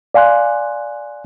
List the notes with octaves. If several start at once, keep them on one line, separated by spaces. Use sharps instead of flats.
D5 F5 G#5 C6 F#6